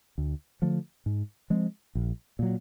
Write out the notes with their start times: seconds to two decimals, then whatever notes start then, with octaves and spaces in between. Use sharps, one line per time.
0.18 D2
0.62 D3 F3 A3
1.06 G#2
1.50 F3 G#3 C4
1.95 A#1
2.39 A#2 F#3